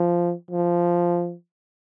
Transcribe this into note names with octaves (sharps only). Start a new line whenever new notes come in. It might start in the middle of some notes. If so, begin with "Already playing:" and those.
Already playing: F3
F3